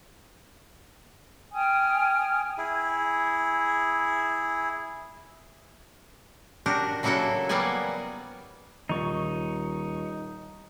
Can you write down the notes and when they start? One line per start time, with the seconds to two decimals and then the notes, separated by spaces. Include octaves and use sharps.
1.53 G5 G#5 D#6 F6
2.58 E4 G#4
6.66 D4 F#4 G4 A#4
7.03 C#3 F#3 A#3 E4 F#4 A4
7.49 F#3 G3 A#3 B3 D5 G#5
8.89 D#1 D#4 C#6